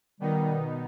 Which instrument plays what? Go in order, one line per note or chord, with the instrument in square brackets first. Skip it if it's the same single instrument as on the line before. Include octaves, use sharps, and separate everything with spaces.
[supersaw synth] B2 B3 D#4 [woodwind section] D#3 G3